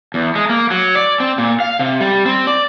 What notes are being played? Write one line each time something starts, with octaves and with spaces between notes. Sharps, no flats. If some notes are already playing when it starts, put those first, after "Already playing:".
E2
G#3
A#3
F#3
D5
C4
A#2
F5
C3
G3
C4
D5